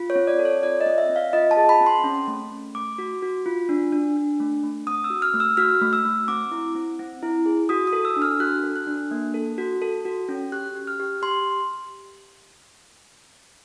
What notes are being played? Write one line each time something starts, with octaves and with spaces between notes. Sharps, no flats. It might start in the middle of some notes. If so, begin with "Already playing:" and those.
Already playing: F4
C#5
C4
D5
A4
C#5
F4 D5
D#5
C4
E5
C4
F5
F4 D#5
A5
G#4
B5
C4
C6
C#4
A3
A3
A3 D6
F#4
F#4
F4
D4
D4
D4
A3
A3
C4 D#6
E6
F#4
F6
A3
E6
F#4 F6
A3
E6
A3
C4 D6
E4
C4
C4
E4
G#4
F#4 D#6
D#6
A4
E6
D4
F6
F#4 F#6
A4
F#6
D4
A#3
A4
F#4
A4
F#4
C#4
G4 F#6
G4
F6
G4
G4 C6